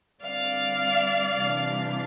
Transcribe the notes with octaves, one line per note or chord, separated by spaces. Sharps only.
D3 G3 C4 D5 F5
C3 E3 G3 D4